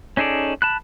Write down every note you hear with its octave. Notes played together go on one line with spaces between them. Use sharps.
C#4 D#4 G#4 A4 D5
A5 B5 F#6